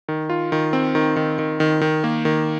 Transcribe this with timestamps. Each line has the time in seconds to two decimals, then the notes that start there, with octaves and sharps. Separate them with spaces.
0.08 D#3
0.30 F4
0.52 D#3
0.73 C4
0.95 D#3
1.17 D#3
1.39 D#3
1.60 D#3
1.81 D#3
2.04 A#3
2.25 D#3